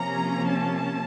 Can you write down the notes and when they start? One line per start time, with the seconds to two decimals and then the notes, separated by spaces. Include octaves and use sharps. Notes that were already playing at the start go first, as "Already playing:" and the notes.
Already playing: C3 F3 A#3 C#4 A#5
0.50 A5